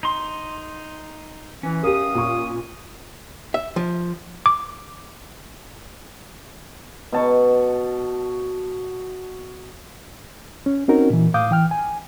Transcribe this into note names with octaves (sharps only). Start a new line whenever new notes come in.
D#4 C6
E3 C#4
F#2 G4 A#4 F5 D#6
A#2 C#6
E5
F3
D6
B2 A5 C#6
C#4
C4 C#4 D#4 F#4 A#4
A#2 E3
A2 F5 D6 D#6 G6
E3 G5 F6
G#5